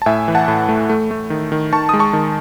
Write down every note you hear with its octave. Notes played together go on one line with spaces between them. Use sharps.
A5
A2 E5 G#5
E3
F#5 A5
A2
A3
A3
A3
D#3
D#3
D#3 A5 C#6
G#3 D#6
A5 C#6
D#3